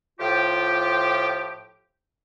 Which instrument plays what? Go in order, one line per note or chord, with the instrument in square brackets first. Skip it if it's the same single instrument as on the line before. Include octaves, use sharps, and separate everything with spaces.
[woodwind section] A2 F3 F4 G4